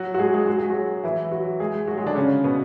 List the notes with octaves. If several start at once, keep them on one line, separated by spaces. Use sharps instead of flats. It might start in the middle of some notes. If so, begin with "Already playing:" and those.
Already playing: F#3 F#4
F#4
G#3 G#4
G#3 G#4
F#4
G#4
F#3 F#4
E3 E4
F#3 F#4
G#3 G#4
F#3 F#4
G#3 G#4
D3 D4
C#3 C#4
B2 B3